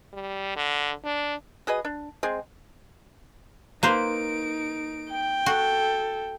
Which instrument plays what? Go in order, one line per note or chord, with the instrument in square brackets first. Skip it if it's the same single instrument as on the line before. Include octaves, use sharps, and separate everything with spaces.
[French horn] G3
D3
D4
[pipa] F#4 G#4 B4 D#5
D4
G#3 C4 G#4
[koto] A#3 B4 C5 [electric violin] D#4 D7
[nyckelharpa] G5
[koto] F#4 [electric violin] A4